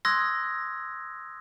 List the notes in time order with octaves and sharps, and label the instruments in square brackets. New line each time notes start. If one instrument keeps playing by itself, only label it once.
[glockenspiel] C6 D#6 E6 F#6 G#6 A#6